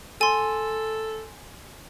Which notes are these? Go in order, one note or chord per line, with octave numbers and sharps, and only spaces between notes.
A4 G#5 C6